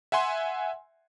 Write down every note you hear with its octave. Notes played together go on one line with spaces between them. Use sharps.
E5 F#5 G#5 C6